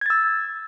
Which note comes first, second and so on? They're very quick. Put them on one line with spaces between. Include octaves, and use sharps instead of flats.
G#6 A6 E6